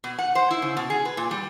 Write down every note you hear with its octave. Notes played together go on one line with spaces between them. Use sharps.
B2
F#5
C5
E4
C#3
B2
G#4
B4
A#2
G3